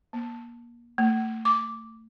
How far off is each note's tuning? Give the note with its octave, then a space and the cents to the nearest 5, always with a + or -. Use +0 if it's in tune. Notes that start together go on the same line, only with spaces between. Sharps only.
A#3 +30
A3 +35
D6 -10